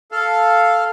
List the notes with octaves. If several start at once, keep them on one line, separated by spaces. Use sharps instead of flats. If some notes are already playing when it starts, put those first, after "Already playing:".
A4 F5